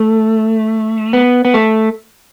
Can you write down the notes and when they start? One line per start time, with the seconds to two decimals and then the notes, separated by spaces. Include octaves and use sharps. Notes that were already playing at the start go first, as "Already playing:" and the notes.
Already playing: A3
1.13 B3
1.45 B3
1.54 A3